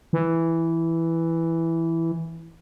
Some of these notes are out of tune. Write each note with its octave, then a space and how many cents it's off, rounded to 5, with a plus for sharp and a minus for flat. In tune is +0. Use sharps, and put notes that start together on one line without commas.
E3 +0